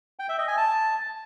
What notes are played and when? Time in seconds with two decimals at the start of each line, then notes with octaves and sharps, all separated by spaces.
0.19 G5
0.29 E5
0.38 D#5
0.48 G#5
0.57 A5